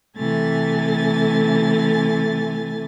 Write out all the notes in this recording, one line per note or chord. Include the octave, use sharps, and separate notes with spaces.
C3 E3 A3 A4 G#5 A6